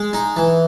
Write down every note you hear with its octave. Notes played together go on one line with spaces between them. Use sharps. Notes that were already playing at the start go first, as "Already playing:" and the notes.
Already playing: G#3
D#4
E3